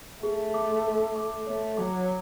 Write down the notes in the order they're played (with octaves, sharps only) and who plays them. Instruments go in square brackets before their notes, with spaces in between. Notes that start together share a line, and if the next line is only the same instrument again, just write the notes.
[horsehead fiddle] A3 [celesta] G#4
[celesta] D6
A4
D6
[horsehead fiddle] A3 [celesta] C#5
[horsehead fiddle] F#3 [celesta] D6